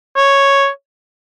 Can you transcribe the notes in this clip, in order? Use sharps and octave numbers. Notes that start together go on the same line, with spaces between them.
C#5